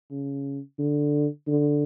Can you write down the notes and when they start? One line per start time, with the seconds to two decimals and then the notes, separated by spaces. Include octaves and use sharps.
0.11 C#3
0.79 D3
1.48 D3